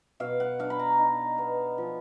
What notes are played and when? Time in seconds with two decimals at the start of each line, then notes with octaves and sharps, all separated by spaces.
0.20 B2 F5
0.40 F#5
0.59 D4 F5
0.70 B5
0.79 A#5
0.99 D#4
1.38 B3
1.78 F3